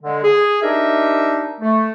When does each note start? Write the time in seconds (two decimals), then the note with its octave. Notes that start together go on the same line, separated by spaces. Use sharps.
0.03 D3 G#3
0.23 G#4
0.62 D4 D#4 G4 A#4 D#5 E5
1.60 A3